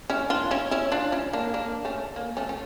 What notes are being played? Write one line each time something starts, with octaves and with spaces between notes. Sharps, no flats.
C#4 E4
D4 F4
C#4 E4
C#4 E4
D4 F4
C#4 E4
A#3 D4
A#3 D4
A3 C#4
A#3
A3 C#4
C#4